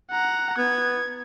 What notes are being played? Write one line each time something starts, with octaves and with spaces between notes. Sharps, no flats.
F#5 A#5
B3 G#6